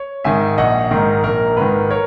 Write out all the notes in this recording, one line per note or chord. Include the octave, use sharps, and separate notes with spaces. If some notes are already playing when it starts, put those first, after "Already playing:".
Already playing: C#5
G#2 D#3 E5 G#5
A#1 D#5 F#5
G#2 D#3 A#4
A#1 A#4
G#2 D#3 B4
A#4 C#5